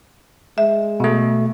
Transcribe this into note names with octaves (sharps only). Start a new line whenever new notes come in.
G#3 E5
B2 A3